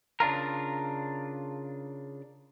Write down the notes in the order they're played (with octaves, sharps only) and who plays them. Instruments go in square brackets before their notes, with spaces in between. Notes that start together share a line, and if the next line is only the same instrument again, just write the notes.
[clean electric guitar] C#3 D4 F4 A#4